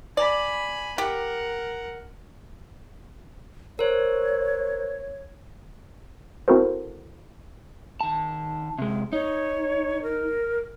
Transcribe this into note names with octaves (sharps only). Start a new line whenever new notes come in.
D5 G#5 B5
G4 A#4 F#5
A#4 C5 C#5
C4 E4 F#4 A4 A#4 C5
D#3 A5
C3 G#3
D#4 C#5
A#4